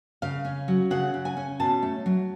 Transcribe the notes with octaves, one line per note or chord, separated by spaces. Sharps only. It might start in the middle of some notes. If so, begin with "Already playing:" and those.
C#3 F5
C#4
F#3
C#3 F#5
C#3
G#5
C#4
B2 A5
A3
F#3